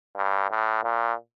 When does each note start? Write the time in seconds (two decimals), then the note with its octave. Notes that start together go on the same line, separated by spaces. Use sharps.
0.16 G2
0.50 A2
0.83 A#2